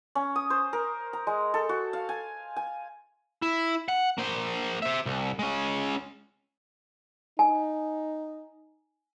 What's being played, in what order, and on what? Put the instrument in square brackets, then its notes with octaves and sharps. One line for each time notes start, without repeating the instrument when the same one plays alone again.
[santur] C#4
D#6
C5
A#4
A#5
G#3
A4
F#4
F5
G#5
G#5
[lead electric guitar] E4
F#5
A#3 C5
C5 E5
C2
G#3 C#4
[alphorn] D#4 [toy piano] G#5